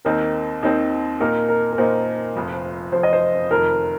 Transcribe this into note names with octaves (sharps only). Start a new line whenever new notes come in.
D#2 D#3 C4 D#4 A#4
D#2 D#3 C4 D#4
A#2 A#3 D#4 A#4
A#4
A#4
A#2 A#3 D#4 C5
F1 F2 F3
F1 F2 F3 C5
D#5
C5
F1 F2 D#3 A#4